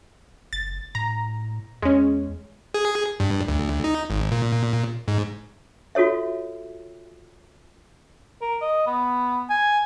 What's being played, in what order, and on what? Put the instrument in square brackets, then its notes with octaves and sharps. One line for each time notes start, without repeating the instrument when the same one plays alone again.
[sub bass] F#1 [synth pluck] A6
[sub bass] A2 [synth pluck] A#5
[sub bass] E2 [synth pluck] G#3 C#4
[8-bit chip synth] G#4
G2
D2
D#4
G#1
A#2
G#2
[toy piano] F4 F#4 A4 C#5 E5
[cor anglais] A#4
D#5
B3
G#5